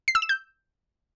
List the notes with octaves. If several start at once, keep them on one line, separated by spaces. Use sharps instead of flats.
C7
E6
E7
G6